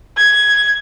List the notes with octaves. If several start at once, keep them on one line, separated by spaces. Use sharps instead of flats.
G#6